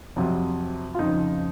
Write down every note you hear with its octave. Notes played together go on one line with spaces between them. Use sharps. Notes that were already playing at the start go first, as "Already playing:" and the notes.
F2 C3 F#3
F4
F2 C#3 F3 D#4